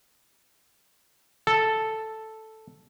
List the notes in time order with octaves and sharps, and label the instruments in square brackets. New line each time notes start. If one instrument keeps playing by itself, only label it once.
[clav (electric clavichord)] A4